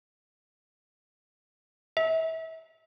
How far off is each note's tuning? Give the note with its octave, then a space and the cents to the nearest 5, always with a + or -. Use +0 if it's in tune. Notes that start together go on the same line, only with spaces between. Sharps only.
E5 -30